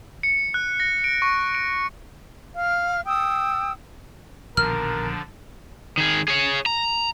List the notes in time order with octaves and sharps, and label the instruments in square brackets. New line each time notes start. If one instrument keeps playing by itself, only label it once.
[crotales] C#7
F#6
A#6
D7
C#6
D7
[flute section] F5 F6
G5 D#6 E6
[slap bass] A#1 B2 D#3 [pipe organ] D3 F3 D4 [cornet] A#4 [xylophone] F6
[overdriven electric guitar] D#3 G#4
G#4 C#5
A#5